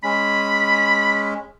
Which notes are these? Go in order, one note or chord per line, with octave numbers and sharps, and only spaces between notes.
G#3 C#4 B5